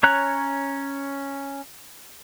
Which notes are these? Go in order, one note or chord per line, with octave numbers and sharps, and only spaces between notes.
C#4 C#5 A#5 F#6